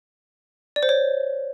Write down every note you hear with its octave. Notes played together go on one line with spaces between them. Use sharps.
D5
C5
C#5